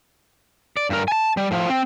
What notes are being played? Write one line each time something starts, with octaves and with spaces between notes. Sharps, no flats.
D5
G2 A#4
G#5 A5
G3
A2 F3
C4